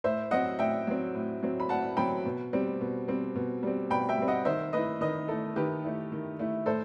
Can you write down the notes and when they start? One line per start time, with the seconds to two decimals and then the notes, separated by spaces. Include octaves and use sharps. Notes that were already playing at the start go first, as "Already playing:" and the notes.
0.04 A2 C5 E5
0.31 F#3 C4 D#5 F#5
0.59 A2 E5 G5
0.87 F#3 C4
1.14 A2
1.43 F#3 C4
1.60 B5
1.69 A2 F#5 A5
1.97 F#3 C4 G5 B5
2.26 B2
2.53 G3 C4
2.81 B2
3.08 G3 C4
3.35 B2
3.63 G3 C4
3.90 B2 G5 B5
4.09 E5 G5
4.18 G3 C4
4.28 D#5 F#5
4.45 D#3 C5 E5
4.73 A3 E4 B4 D#5
5.01 D#3 B4 D#5
5.28 A3 E4 A4
5.56 D#3 G4 B4
5.84 A3 E4
6.12 D#3
6.39 A3 E4
6.66 A2 A4 C5